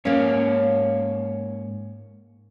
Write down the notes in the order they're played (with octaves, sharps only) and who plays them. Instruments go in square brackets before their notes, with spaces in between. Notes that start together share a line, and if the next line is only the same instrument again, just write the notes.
[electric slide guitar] G#2 C#5 F5 [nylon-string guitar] A#3 C#4